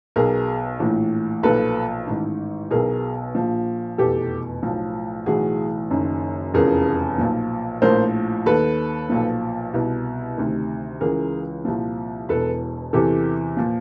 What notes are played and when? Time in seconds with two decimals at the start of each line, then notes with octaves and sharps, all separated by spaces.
0.16 B1 B2 G#4 A#4
0.79 A#1 A2 E3
1.43 B1 A#2 F3 A4 B4
2.07 A1 G#2 D#3
2.71 B1 B2 G#4 A#4
3.35 A#1 A#2 F3
3.98 F1 E2 B2 G4 A4
4.63 B1 A2 F3
5.26 B1 A2 E3 F#4 G#4
5.90 F#1 F#2 D#3
6.54 F1 E2 C#3 F3 G#4 A#4
7.18 B1 A#2 F3
7.82 A#1 A2 F3 A#4 C5
8.45 D#2 D#3 A4 B4
9.09 B1 A#2 F3
9.74 C2 B2
10.38 D2 C3 D#3
11.01 C#2 C#3 E3 G#4 A#4
11.65 C2 A#2 F3
12.29 E1 E2 B2 A4 B4
12.93 E2 C3 E3 G4 A4
13.57 A#2 F3